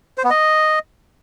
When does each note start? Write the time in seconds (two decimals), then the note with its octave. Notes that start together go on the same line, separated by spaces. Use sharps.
0.18 C5
0.24 B3
0.30 D#5